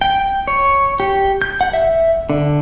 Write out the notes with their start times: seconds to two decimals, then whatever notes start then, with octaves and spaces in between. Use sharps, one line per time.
0.01 G5
0.47 C#5
1.00 G4
1.42 G6
1.61 F#5
1.73 E5
2.30 D3